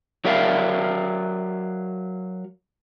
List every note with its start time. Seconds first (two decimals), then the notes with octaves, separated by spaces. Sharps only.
0.25 F#3 F#4 A#4 D5 E5 F5